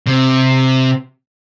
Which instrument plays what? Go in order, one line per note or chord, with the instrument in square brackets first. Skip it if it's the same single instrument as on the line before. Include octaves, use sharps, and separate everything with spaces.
[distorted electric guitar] C3